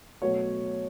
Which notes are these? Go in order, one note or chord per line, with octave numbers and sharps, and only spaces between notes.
B2 F#3 A3 C#5